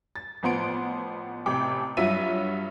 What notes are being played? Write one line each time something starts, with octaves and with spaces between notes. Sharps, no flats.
A6
A1 F3 B3 C6 D7
A1 C3 G5 D6
G2 F#3 F4 E5 D#7